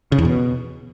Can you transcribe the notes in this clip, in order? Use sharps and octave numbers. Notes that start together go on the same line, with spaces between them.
C#3
E2
B2